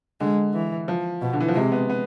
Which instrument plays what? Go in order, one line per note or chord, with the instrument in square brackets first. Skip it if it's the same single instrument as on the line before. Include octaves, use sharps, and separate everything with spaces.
[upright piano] D3 [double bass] G#3
[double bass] E3
[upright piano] F3
[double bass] B2
[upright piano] D3
E3
F3
[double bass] C3 [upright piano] G#3
[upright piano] B3
B3